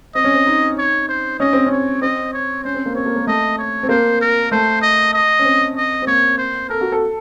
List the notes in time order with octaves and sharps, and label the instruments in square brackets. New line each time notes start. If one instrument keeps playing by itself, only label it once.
[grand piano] C4 [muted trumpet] D#5
[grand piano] C#4
C4
D#4
[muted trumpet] C#5
C5
[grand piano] C#4 [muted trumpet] D#5
[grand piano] C4
C#4
[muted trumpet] C#5
[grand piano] C4 [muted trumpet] D#5
[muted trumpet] C#5
[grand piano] C#4 [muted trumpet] C5
[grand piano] C4
A#3
[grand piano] C4 [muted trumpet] C#5
[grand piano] A#3
A#3
[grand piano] A3 [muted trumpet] D#5
[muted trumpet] C#5
[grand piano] C4
[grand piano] A#3 [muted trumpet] C5
[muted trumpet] A#4
[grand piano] A3 [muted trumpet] C5
[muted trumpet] D#5
D#5
[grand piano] C#4
C4
[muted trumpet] D#5
[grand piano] C4
[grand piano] A#3 [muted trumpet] C#5
[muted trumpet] C5
[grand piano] A4 [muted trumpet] A#4
[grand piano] F#4
A4